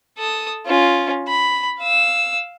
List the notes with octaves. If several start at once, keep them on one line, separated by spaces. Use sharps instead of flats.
A4 D#6
C#4 F4
B5
F5 E6